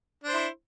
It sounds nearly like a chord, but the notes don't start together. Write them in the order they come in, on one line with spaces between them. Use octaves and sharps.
D4 C5 E4